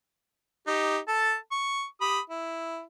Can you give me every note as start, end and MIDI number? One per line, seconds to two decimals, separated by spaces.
0.67 0.98 63
0.67 0.98 67
1.08 1.35 69
1.08 1.35 81
1.52 1.84 85
2.01 2.19 67
2.01 2.19 83
2.01 2.19 87
2.30 2.82 64